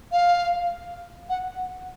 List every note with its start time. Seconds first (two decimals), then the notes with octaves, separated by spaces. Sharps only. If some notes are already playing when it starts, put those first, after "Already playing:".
0.12 F5
1.29 F#5